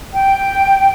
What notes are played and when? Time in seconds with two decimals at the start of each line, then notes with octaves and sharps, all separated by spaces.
0.13 G5